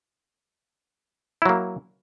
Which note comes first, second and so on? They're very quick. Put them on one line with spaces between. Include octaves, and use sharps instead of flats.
E4 F#3 A#3